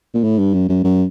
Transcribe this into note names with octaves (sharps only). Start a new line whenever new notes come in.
A#2
A2
G2
F#2
F#2
F#2